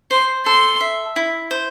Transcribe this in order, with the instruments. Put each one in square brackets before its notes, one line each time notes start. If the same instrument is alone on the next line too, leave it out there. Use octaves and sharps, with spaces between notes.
[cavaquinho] C5 [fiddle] C6
[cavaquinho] A4 [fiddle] C6
[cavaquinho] E5
E4
C5